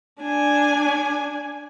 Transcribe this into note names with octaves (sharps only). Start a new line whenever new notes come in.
D4 G#5